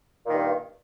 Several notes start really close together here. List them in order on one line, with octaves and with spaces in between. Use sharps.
A#2 D#3 G2